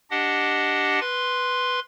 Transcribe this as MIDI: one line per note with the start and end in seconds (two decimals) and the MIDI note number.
0.11 0.99 62
0.11 0.99 67
0.11 0.99 75
0.11 0.99 78
1.00 1.80 71
1.00 1.80 84